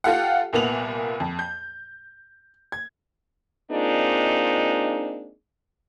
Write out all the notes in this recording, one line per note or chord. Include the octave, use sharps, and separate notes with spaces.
F4 G4 A4 F5 F#5
C2 A#2 A#3 B3 F7 F#7
F2
G6
G#6
G#3 A#3 C4 D4 D#4 F4